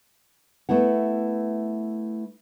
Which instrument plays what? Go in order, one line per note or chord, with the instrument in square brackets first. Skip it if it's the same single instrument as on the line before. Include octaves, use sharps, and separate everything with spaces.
[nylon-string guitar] A3 B3 E4 F#5